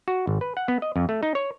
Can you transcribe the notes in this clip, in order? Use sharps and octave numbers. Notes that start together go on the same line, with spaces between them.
F#4
G#1
B4
F#5
B3
D#5
F2
A3
D#4
C#5